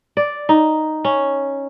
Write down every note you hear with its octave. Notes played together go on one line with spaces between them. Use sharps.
D5
D#4
C#4